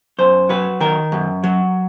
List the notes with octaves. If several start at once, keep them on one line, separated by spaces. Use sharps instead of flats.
F#2 C5
F#3 B4
D#3 A#4
F#2
F#3